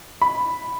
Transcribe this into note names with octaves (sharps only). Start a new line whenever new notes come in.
B5